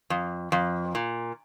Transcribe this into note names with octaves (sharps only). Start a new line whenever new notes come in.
F2
F2
A#2